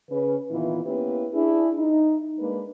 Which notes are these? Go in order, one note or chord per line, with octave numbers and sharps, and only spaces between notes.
C#3 C#4 B4
A#2 D#3 E3 B3 E4 F4
A#3 B3 C#4 E4 G4 B4
D4 E4 G#4
D#4
G#3 A#3 D4 B4